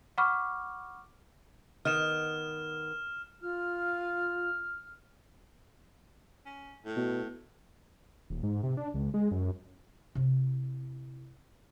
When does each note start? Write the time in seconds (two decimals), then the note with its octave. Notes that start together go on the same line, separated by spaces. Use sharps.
0.18 F#5 B5 C#6 D6 F6
1.85 D#3 B3 D#5 F6 E7
3.42 F4 F6
6.46 C#4
6.86 A2
6.97 B2
8.30 D#1
8.43 G#2
8.63 C3
8.77 D4
8.94 C#2
9.14 G#3
9.31 F#2
10.15 C3 E4